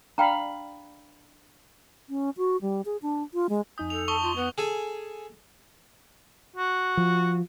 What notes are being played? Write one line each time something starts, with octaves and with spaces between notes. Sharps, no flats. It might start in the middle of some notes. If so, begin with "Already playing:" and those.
D4 F5 G5 A#5 B5
C#4
F#4
G3
G#4
D4
F4
G#3
F2 D#4 G#5 D#6 G6
A4 F7
A5 C#6 D#6 G7
F4
B3 B4
G#4 A4 G#5
F#4
F3